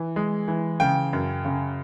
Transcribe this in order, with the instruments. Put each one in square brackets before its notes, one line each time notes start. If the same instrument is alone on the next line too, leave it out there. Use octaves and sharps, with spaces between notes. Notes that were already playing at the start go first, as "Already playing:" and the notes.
Already playing: [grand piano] E3
G#3
E3
C#3 G5
F#2
C#3